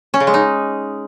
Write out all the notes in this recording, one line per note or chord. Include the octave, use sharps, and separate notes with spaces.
C#4
C#3
G#3
D#4